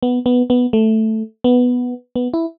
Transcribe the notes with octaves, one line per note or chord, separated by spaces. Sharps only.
B3
B3
B3
A3
B3
B3
E4